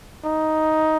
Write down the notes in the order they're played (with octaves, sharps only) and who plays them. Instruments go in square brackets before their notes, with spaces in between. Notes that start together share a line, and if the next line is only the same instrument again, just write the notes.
[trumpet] D#4